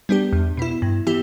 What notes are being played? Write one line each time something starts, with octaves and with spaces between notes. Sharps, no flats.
G3 B3 D4 G4
E2
B2 B3 E4
G2
E3 B3 E4 G4